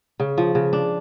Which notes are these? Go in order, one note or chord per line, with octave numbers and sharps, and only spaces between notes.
C#3
F3
C#3
D4